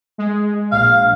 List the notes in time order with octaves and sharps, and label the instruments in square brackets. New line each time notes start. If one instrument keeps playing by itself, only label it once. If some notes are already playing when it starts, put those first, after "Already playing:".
[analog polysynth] G#3
[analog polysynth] A#1 [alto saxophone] F5